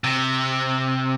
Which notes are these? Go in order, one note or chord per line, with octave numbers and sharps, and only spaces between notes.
C3